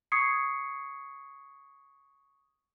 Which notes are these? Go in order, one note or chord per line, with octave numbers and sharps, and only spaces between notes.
C#6 D#6 G#6 C7 C#7